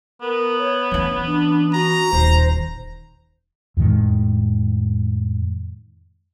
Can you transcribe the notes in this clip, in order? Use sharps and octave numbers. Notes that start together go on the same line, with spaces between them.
B3 A#4
C#5
E3 C#4
D4
F#4 A#5
D#1 C5
F2 A2 D#3 G#3